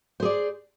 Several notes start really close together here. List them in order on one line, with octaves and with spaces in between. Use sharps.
C5 G#4 D5